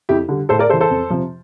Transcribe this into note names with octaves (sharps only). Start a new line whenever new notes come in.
F2 E4 G4
D3 G3
A2 A4 C5
A#4 D5
E3 G3 A4 C5
A4 C5
F2
C3 F3